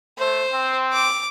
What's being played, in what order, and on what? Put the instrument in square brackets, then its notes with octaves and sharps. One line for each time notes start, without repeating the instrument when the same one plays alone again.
[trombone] A3 [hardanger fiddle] C5
[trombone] C4
[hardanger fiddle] D6